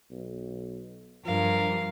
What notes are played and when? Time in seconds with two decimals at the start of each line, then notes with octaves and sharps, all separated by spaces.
0.11 B1
1.25 G2 F3 A#4 F5